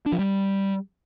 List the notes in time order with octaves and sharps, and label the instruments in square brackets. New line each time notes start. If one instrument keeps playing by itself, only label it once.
[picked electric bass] D4
F3
G3